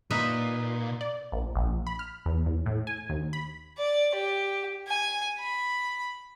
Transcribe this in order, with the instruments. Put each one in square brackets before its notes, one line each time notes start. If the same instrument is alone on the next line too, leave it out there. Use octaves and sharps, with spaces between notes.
[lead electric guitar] A#2 [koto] D#4 B4 E5
[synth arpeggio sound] D5
A#1
A#1
B5
F6
E2
E2
A2
G#5
D#2
B5
[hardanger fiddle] D5
G4
G#5
B5